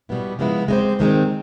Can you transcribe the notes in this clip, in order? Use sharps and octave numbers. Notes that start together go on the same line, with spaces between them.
B2 G3 B3 E4
C#3 F3 G#3 B3 E4
G#3 C4 D#4 G4 C5
G2 D#3 G#3 C4